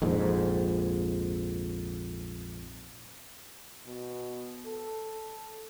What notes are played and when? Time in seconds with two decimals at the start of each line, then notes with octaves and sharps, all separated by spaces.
0.02 A#1 F2 G#2
3.86 B2
4.66 A4